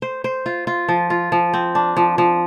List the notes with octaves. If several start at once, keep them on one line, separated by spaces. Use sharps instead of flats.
C5
C5
F4
F4
F3
F4
F3
C4
D4
F3
F3